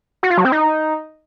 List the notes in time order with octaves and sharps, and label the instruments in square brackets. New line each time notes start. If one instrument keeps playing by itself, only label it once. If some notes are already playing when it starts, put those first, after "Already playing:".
[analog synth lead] F#4
F4
F#3
C4
D#4